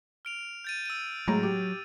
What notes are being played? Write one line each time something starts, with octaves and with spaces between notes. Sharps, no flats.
F6 D7 F7
G6 A6 D#7
E6 D#7
A2 F#3 G#3 A#5
G4